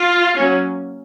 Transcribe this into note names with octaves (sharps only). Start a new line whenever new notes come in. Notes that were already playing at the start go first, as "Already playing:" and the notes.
Already playing: F4
F#3 A#3 C#4